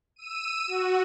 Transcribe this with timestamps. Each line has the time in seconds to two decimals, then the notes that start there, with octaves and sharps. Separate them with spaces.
0.16 E6 D#7
0.67 F#4